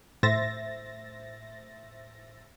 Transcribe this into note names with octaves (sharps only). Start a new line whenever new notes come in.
A2 C5 E5 A6 A#6